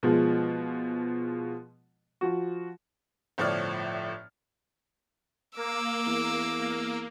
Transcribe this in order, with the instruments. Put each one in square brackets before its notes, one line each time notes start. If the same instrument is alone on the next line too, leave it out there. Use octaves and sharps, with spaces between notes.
[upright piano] B2 F3 G#3
F3 F#4
G1 A2 F3 C#5 D5 F6
[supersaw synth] A#3 [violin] D6 E6
[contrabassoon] E2
[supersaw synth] A#3